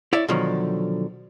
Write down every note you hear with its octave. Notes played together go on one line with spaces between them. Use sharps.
E4 C#5 D5 E5
B2 D3 D#3 F3 F#3